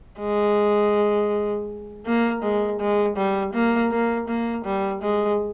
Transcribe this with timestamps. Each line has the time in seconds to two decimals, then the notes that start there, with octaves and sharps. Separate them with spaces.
0.19 G#3
2.05 A#3
2.43 G#3
2.80 G#3
3.17 G3
3.53 A#3
3.91 A#3
4.28 A#3
4.65 G3
5.02 G#3